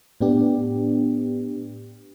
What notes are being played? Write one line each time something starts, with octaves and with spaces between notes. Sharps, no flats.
A2 B3 D4 G4